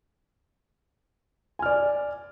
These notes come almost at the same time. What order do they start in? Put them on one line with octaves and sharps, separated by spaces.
G#5 F6 D5